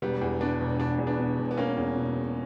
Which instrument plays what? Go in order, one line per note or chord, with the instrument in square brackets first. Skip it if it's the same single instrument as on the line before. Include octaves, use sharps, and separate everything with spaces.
[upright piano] E1 [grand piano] G3 B3
[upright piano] E2
[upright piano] B2 [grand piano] B3 D4
[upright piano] E1
[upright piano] E1 [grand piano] D4
[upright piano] E2
[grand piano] B3 D4
[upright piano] B2
E1
[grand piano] B3
[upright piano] E1 [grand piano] A#3 C#4
[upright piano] E2
B2
E1